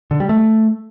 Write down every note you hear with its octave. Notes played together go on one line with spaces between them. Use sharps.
D3
G3
A3